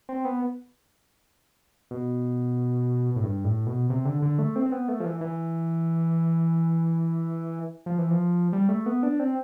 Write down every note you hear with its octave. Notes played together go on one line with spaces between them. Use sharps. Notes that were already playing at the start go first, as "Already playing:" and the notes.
C4
B3
B2
A2
G2
A2
B2
C3
D3
D3
A3
C4
C4
B3
A3
F3
E3
E3
F3
E3
F3
G3
A3
B3
D4
C4